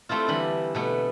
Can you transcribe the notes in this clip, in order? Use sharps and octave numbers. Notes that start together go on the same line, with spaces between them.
G3 A3 C4 E4 F4
D3 E3 G3 B5
B2 A3 B3